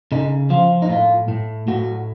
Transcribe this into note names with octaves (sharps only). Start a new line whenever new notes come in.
C#3 D#4
F3 F4
D#4
A2 F4
A2
A2 F#4